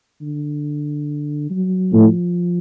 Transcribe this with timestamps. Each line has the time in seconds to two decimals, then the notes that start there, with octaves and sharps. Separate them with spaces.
0.22 D3
1.50 F#3
1.92 A2 F3